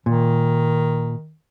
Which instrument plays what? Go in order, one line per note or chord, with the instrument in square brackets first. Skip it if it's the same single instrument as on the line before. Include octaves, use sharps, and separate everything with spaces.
[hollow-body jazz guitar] A#2 [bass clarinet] D#3